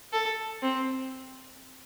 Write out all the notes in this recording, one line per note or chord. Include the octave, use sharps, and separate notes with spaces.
A4
C4